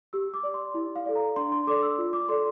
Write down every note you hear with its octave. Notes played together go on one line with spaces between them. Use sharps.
G4 E6
D6
D5
C6
E4
F5
A4 D5
A#5
D4 C6
C6
A4 D5 D6
E6
F4
D6
A4 D5 C6